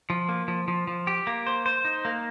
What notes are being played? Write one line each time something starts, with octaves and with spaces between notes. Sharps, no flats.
F3
A#3
F3
F3
F3
G4
A#3
C5
C5
D#4
A#3